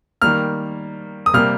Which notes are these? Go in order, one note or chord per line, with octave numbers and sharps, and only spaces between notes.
D#3 G3 A#3 F6
D#6
C3 G3 A#3 F6